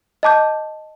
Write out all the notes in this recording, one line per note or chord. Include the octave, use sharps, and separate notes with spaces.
D#5 A5 D6 G6